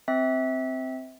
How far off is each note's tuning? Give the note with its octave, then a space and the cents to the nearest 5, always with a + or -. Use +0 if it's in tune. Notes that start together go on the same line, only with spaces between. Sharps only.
C4 -5 E5 -25